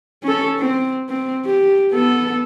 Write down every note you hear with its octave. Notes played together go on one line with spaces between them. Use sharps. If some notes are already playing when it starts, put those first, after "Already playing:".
C#4 A4
C4
C4
G4
B3 A4